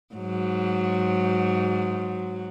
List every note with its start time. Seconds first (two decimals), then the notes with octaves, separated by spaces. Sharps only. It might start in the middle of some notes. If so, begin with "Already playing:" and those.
0.14 G#2 F#3